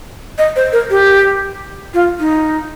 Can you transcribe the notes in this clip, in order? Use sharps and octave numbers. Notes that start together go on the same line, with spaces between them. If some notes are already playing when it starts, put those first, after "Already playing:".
D#5
C5
A#4
G4
F4
D#4